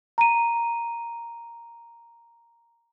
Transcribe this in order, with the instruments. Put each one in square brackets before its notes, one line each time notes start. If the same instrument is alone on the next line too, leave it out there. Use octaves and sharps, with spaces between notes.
[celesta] A#5 D#7